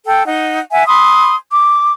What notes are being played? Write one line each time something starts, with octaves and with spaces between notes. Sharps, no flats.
A4 G5
D#4 F#5
E5 F#5 G#5
B5 C6 D#6
D6